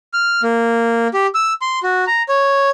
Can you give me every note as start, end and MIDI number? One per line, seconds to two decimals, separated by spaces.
0.13 0.41 89
0.43 1.08 58
1.14 1.27 67
1.35 1.53 88
1.62 1.79 84
1.83 2.04 66
2.07 2.22 82
2.29 2.70 73